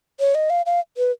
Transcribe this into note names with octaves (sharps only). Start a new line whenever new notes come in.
C#5
D#5
F5
F5
B4